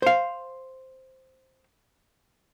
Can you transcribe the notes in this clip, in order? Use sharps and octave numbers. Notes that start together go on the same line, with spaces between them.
C5 F5